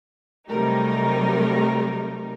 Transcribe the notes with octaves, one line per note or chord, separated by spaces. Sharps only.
C3 F#3 G3 A3 D#4 A#4